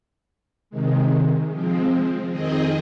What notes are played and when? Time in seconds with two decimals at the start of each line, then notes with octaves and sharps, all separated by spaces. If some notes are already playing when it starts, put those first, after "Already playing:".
0.70 C3 D#3 G#3
1.51 F3 G#3 C4
2.31 F2 D#3 C4 G#4 D#5